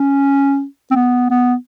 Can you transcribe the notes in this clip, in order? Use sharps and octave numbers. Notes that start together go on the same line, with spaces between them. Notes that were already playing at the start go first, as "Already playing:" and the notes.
Already playing: C#4
C4
B3
B3